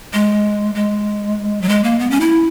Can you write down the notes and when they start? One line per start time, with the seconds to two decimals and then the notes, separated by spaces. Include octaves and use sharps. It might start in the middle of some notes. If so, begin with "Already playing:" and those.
0.13 G#3
0.75 G#3
1.61 F#3
1.69 G#3
1.84 A#3
1.99 B3
2.10 C#4
2.20 E4